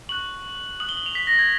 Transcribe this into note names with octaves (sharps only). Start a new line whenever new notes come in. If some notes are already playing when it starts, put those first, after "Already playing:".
C#6 F#6 F#7
D#6 F#6 F#7
G7
F#7
F7
B6
A#6
G#6